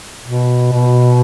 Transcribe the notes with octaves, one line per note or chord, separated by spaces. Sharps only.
B2
B2